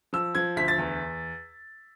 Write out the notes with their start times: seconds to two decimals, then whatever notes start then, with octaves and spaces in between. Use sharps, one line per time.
0.13 F3 E6
0.35 F3 G#6
0.56 D2 B6
0.68 A6
0.78 E2